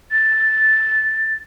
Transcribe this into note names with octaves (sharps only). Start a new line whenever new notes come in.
A6